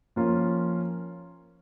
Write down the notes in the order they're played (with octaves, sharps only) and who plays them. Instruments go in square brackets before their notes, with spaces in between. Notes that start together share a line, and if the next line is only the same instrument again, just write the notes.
[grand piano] F3 A#3 C#4 F4